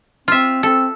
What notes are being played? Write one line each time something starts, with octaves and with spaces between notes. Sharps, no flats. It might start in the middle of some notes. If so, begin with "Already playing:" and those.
C4 F4 E5
C4 A4